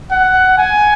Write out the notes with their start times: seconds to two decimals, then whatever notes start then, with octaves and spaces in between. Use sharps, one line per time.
0.11 F#5
0.58 G#5